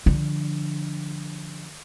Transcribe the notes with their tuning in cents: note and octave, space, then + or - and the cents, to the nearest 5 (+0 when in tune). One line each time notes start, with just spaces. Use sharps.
D3 +0 F3 -15